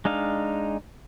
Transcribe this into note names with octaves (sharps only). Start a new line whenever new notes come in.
G#3 D4 D#4 F5